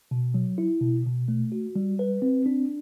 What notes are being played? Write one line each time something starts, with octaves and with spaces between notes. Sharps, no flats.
B2
F#3
E4
B2
B2
A3
F#4
G3
B4
C4
D4